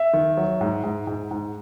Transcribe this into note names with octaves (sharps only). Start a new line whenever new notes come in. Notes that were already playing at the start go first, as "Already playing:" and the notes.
Already playing: E5
D#3
F#3
G#2
G#2
G#2
G#2